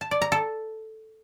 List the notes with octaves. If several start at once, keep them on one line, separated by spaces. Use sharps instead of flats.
A5
D5
A#5
A4